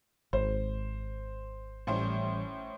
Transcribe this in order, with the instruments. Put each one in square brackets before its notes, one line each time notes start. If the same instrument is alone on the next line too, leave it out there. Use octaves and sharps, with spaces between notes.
[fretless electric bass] G#1 [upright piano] C5
[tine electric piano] A1 G3 [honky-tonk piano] A2 C#4 C5